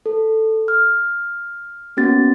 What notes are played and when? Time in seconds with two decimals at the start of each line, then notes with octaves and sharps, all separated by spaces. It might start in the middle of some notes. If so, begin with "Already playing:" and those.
0.06 A4
0.68 F6
1.97 A#3 B3 C#4 F#4 A6